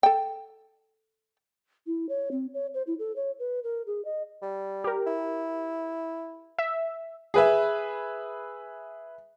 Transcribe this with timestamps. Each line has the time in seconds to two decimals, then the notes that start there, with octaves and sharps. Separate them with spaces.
0.03 A4 G5
1.87 E4
2.09 C#5
2.31 C4
2.54 C#5
2.74 C5
2.87 E4
2.99 A4
3.16 C#5
3.39 B4
3.64 A#4
3.87 G#4
4.05 D#5
4.42 G3
4.84 G4 A#4
5.06 E4
6.58 E5
7.34 G#4 B4 E5